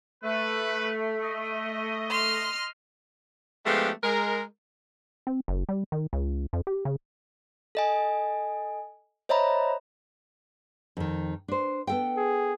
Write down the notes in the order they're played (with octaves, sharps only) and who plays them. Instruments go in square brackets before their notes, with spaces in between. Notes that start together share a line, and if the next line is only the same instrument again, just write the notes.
[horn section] A3 [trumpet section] B4
[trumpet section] D#5
[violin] C6 F6
[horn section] F3 G#3 A3 B3 D4 G4
G#3 A#4
[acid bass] C4
F#1
G3
D#3
C#2
F2
G4
C#3
[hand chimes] A4 D#5 G#5
C5 C#5 D#5 E5 A#5 B5
[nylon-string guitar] F2 D#3
D4 C5
B3 A4 G5
[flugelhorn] G#4